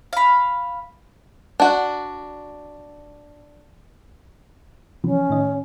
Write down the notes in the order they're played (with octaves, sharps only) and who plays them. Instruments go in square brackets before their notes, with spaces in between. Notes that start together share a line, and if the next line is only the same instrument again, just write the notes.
[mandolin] F5 B5
[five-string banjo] D4 F#4
[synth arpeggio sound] C3 E3 F3 [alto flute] C#4
[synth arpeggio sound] A2 D#3 D#5